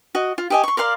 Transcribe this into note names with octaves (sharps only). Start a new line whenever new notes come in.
F#4 D#5
F4
G4 D#5 G#5
C6 C#6
A#4 D5 F5 C6